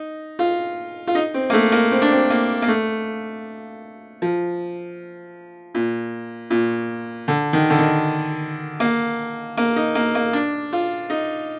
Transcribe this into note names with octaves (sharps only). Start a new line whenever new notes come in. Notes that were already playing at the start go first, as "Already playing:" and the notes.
Already playing: D#4
F4
F4
D#4
C4
A#3
A3
A#3
C4
D4
C4
A#3
A#3
A3
F3
A#2
A#2
D3
D#3
D3
D#3
A#3
A#3
D#4
A#3
A#3
D4
F4
D#4